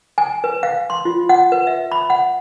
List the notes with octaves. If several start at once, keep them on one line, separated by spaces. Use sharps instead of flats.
G#5
B4
F5
C6
F4
F#5
B4
E5
B5
F#5